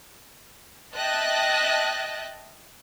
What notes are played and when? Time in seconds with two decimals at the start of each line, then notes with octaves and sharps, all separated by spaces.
0.95 D#5 E5 G5 A5 F#6 A6